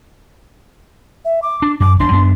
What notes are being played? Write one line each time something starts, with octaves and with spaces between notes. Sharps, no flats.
E5
D6
D4
F#2 D6
E1 D4 C6
F#2 B3 D4